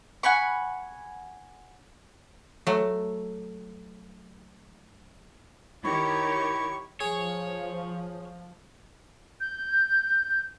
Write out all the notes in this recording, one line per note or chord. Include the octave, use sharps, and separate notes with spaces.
F#5 G#5 B5 C#6
F#3 A3
D#3 E4 G4 C#5 C#6
F3 G#4 C#5
G6